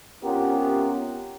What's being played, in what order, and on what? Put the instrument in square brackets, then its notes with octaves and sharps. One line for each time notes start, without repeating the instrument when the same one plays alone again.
[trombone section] C3 B3 C#4 F4 G4 A#4